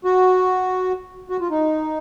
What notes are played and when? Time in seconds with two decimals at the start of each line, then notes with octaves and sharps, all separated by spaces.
0.04 F#4
1.30 F#4
1.40 F4
1.51 D#4